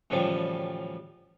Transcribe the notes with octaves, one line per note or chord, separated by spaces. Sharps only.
F#2 A2 D3 E3 F3 G3